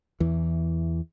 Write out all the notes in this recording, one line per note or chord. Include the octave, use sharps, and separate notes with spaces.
E2 E3